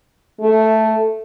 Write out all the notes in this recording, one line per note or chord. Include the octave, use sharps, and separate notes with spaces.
A3